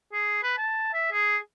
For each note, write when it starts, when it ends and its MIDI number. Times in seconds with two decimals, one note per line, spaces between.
0.13 0.41 68
0.43 0.53 71
0.58 0.93 81
0.93 1.09 76
1.12 1.37 68